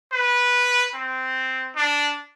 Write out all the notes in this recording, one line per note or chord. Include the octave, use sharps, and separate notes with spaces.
B4
C4
D4